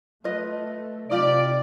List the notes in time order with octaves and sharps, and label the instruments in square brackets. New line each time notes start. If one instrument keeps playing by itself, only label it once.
[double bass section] A3 [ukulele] F4 B4 D#5
[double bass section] C3 [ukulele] D#4 F4 G4 [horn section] D5